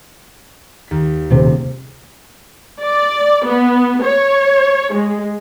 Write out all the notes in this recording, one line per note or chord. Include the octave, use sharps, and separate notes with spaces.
D#2 B6
D#1 C3 G#4 C5
D5
B3
C#5
G#3